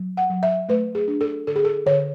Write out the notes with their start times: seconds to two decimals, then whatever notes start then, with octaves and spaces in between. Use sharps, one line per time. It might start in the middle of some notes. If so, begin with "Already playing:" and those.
Already playing: F#3
0.17 F#5
0.30 F#3
0.43 E5
0.69 A3 B4
0.95 G#4
1.08 D4
1.21 A4
1.47 D3 A4
1.56 G#4
1.65 A4
1.86 D3 C#5